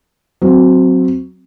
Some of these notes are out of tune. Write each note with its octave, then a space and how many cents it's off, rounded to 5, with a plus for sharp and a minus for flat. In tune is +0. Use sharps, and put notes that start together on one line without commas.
F#3 +0 C4 +0